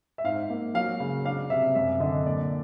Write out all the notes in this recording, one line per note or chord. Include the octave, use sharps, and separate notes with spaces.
E5
G#2 F5
A#3
F#3 F5
C#3
D4 F5
C3 E5
F#2 E5
D3 D#5
A#2 D5